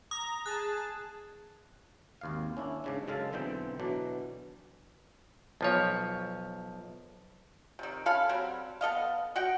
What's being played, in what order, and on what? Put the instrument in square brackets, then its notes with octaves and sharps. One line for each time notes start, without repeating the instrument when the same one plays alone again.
[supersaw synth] A#5 [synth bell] D#6
[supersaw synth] G#4 A5 [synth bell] F#6
[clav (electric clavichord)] G#1 D#2 F5
C#4 D4 E4
G#2 C#3 D4
F#2 C#3 G#3 A4 F5 A5
B1 D3 E3 C4 G5
B2 E3 F#3 D4
B1 F3 C#5
[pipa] C3 D#3
C#4 A4 F5 B5
F#3 G3 C4
B3 A4 D#5 F5
F#4 F#5 G5